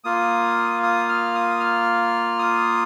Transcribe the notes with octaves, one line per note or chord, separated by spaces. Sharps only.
A#3 F4 D#6
D#6
F6
D#6
F6
D#6